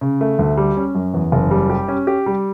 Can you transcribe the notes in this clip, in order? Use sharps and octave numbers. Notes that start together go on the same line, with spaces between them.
C#3
A3
D2
G3
C#4
F#2
E2
F#1
G3
G4
C#4
G4
G3